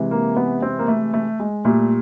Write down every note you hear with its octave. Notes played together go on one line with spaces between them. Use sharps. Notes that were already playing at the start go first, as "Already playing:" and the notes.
Already playing: C3 E3 G#3
A#3
B3
C4
A#3
A3
A3
G#3
A#2 G3 A3